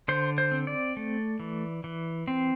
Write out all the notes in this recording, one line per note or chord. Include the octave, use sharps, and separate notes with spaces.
D3 C5
C5
C4
D5
A3
E3
E3
C4